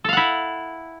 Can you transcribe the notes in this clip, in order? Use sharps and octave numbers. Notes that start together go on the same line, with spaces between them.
E4 A4 F5 F#5